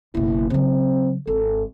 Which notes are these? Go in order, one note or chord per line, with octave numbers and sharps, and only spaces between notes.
F#1 B2 E4
C#3 F#3 C4
G#1 A4